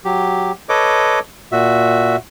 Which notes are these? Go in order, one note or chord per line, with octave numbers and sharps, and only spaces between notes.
F#3 G4
A4 B4 C#5 D#5 D6
A#2 F#4 E5